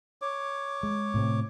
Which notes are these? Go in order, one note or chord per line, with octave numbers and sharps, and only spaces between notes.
C#5 D6
G#3
A2 C3 C4